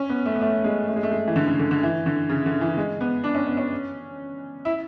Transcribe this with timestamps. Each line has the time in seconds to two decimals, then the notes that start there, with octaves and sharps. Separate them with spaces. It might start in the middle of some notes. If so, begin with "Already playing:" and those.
Already playing: C#4
0.09 B3
0.26 A3
0.35 B3
0.41 A3
0.64 G#3
0.88 A3
0.96 G#3
1.03 A3
1.11 G#3
1.27 E3
1.36 D3
1.47 C#3
1.59 D3
1.71 D3
1.83 E3
2.06 D3
2.29 C#3
2.46 D3
2.61 E3
2.77 G#3
3.01 B3
3.24 D4
3.35 C#4
3.47 B3
3.57 C#4
4.65 E4